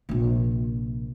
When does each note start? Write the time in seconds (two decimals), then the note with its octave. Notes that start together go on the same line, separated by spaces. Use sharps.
0.09 A#1 C3